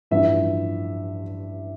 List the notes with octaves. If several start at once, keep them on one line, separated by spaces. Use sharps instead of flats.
A1 G2 F3 E5